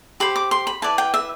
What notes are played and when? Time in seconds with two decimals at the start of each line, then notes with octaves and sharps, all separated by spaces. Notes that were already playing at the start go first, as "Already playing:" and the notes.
0.20 G4 C5 B5
0.36 D6
0.51 C6
0.67 B5
0.82 E4 B4 D5 A5
0.98 G5
1.14 E5